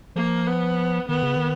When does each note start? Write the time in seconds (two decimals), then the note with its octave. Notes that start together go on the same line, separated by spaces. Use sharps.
0.16 F3 A#3
0.47 B3
1.09 D#3 B3
1.23 C#3
1.36 D#3